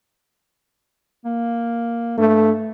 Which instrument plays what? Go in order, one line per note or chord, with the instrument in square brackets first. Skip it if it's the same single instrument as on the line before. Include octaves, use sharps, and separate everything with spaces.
[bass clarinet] A#3
[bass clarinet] G2 [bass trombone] A3